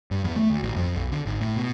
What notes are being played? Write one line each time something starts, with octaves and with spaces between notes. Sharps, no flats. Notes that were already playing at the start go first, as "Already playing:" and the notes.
G2
E2
A3
D2
A1
F2
B1
D3
G#1
A2
B2